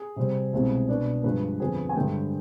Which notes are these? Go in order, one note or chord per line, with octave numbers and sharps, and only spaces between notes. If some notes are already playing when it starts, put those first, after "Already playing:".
Already playing: G#4
C3 G3 C4
C2 B2 G#3 C4
B2 B3 D4
G2 F3 G#3 B4
F2 D3 F3 B3 G#4
G#5
G2 D3 G#3 G5